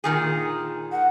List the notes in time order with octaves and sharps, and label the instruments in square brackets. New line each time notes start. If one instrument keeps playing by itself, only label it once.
[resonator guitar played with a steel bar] A#2 D#3 G#4
[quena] F#5